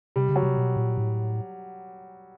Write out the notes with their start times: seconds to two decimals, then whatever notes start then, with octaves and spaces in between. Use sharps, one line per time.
0.16 C3 G3
0.29 C#3
0.36 F#3
0.43 C3
0.57 B2
0.77 A#2
0.98 A2